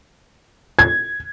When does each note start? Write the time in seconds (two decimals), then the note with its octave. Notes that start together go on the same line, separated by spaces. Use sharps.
0.79 G#6